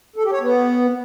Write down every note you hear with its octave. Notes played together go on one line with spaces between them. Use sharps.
A4
G4
C#5
B3